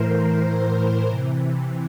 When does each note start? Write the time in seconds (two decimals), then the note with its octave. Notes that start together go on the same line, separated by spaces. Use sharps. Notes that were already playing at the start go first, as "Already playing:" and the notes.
Already playing: A2 E3 A#4 C5
0.42 A2 E3
1.04 C3 E3